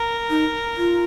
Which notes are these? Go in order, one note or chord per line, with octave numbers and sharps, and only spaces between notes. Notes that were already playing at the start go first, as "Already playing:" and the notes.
Already playing: A#4
D#4
F4